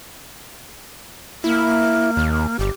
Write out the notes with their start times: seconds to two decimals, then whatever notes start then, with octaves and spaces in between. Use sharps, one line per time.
1.44 A#3 E4
2.17 D#2
2.59 G1 G4